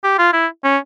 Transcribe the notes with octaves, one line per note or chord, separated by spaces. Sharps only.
G4
F4
E4
C#4